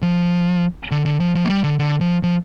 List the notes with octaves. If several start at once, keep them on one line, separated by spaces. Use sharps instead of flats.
F3
D3
D3
F3
F3
A#3
G3
D3
D3
F3
F3